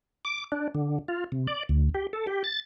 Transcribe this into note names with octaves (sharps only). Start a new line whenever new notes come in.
D6
D4
D3
F4
C3
D5
D2
G4
A4
G4
A6